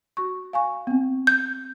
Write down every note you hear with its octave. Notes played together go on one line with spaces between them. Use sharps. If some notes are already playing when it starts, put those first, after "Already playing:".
F#4 C#6
F5 G#5 C#6
B3 C4
G6